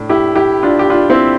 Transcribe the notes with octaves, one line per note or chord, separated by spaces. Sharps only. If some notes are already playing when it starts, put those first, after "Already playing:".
Already playing: A2 D4
E4 G4
E4 G4
D4 F4
G4
D4 F4
C4 E4